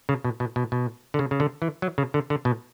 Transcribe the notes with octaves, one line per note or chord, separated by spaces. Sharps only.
C#3
B2
B2
B2
B2
D3
C#3
C#3
D3
E3
F#3
C#3
D3
D3
B2